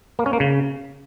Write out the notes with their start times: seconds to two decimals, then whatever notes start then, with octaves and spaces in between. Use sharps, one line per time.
0.19 A#3
0.26 C#4
0.33 A#3
0.40 C#3